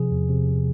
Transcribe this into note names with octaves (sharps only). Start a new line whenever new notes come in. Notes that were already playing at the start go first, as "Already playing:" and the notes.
Already playing: C3 F3 G#4
E2
C3